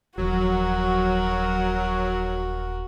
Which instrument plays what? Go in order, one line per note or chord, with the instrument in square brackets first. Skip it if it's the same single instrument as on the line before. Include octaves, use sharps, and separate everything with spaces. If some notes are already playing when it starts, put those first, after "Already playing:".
[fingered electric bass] D#1 F3 [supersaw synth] F#3 [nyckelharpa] F#4 A#4